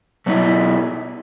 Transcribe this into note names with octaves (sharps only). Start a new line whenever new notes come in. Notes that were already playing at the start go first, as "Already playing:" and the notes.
B2 F#3 B3 E4